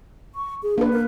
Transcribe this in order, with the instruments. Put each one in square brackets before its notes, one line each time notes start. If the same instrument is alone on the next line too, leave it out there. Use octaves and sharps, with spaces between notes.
[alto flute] C#6
G#4
[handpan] A#3 B4 [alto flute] D4
[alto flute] A#4